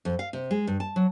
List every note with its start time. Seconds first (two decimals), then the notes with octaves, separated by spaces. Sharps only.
0.05 F2
0.19 F5
0.33 C3
0.51 G#3
0.67 G2
0.80 A5
0.96 F#3